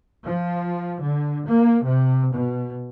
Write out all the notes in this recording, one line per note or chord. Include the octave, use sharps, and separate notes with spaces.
F3
D3
A#3
C3
B2